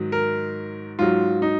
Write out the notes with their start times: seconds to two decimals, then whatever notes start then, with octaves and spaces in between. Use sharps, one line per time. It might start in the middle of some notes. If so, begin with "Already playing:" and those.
Already playing: G#2 D#3 F#3
0.12 A#4
0.99 G#2 F#3 F4
1.42 D#4